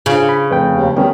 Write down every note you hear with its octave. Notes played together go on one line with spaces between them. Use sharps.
C#3 D4 F4
B5
F1 B4 G5
D#2
D#3 G3 B3 C#4